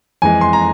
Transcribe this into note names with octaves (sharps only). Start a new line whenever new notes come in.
F2 E3 G#3 G#5
C6
A#5